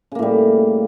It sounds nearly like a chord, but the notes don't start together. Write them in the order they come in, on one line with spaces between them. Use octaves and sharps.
C#3 A#3 A2 G3